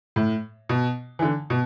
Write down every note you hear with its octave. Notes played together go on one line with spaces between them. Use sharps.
A2
B2
E3
D3
B2